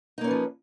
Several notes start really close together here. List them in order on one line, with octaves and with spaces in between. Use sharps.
D#4 A#3 C#4 B4 F3